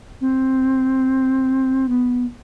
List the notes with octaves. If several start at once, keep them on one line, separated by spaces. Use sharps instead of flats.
C4
B3